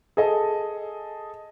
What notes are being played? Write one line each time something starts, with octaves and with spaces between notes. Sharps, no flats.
G#4 A4 D#5 A5